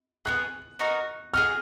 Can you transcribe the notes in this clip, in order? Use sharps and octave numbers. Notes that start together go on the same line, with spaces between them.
B3 D#4 G#4 F#6
B3 D#4 F#4 A#4
G#4 D#5 F#5 F6